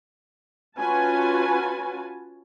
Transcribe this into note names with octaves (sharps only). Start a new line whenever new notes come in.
C#4 F4 F#4 B4 G#5 A5